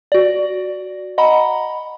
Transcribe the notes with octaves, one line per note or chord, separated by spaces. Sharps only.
F#4 D5
D#5 F#5 A#5 B5